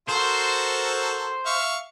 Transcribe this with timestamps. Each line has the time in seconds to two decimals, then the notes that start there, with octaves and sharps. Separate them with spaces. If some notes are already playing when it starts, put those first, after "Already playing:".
0.09 F#4 A4 A#4 C5
1.46 E5 F5 C#6